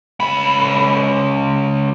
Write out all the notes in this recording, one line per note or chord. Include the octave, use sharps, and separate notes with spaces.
C#2 B5